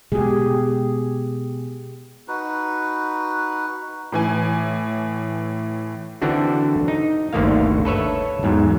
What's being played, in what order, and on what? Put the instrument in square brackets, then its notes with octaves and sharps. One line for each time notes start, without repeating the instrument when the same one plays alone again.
[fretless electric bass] B2 G#3 [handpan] G4 G#4
[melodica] D#4 F#4 B4
[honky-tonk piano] A2 E3 G#5
[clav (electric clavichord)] D3 E3 C4 D4 F#4
D#4
G1 D2 D3 D#3 A#3 F5
A4 B4 C#5 E5
E2 G#2 F#3